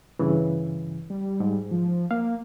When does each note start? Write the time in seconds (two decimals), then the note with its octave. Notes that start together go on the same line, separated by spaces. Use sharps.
0.19 G2 C#3 E3
1.10 G3
1.40 G#2
1.71 F3
2.11 A#3 F5